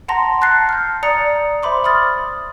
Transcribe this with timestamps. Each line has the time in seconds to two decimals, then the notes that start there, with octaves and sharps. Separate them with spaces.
0.08 F#5 A5 A#5 C6 A#6
0.41 A5 F#6 A6 A#6 C7 C#7
0.69 F6 G6
1.03 D5 A#5 D#6 A6 C#7
1.63 C5 E5 B5 C6 D6
1.84 B5 D6 D#6 F6 A6